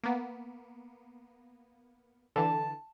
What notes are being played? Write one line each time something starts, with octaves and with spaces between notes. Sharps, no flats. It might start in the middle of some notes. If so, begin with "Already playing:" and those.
A#3 B3
D3 E3 A5